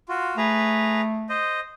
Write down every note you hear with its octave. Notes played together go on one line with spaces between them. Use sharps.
F4 F#4
A3 G#4 B4 A#5
C5 D#5